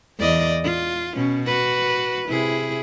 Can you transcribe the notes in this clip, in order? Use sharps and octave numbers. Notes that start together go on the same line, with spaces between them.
E2 D5 D#5
F4
B2 C#4
F#4 B4
C3 E4 G#4